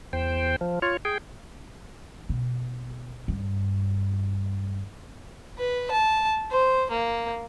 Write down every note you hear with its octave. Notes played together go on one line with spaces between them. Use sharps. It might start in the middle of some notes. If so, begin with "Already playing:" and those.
E2 C5 G5
F3
F4 C#5
G#4 G5
B2
G2
B4
A5
C5
A#3